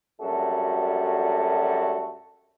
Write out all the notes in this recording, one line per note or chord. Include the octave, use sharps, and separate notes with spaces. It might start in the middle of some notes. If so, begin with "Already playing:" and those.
A#1 F#2 G3 A3 F#4 A4